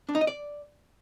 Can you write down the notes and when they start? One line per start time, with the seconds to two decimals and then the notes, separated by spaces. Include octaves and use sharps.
0.09 D4
0.15 D#4
0.21 D#5
0.27 D5